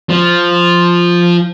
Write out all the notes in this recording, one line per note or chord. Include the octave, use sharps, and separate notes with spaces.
F3